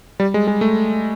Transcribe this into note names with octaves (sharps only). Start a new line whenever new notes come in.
G3
G#3
G#3
A3